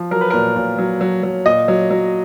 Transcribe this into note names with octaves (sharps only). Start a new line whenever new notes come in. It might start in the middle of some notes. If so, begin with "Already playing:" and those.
Already playing: F3
F#3 A#4
B4
A#2 A#4
A#2
F#3
F#3
F#3
A#2 D#5
F#3
F#3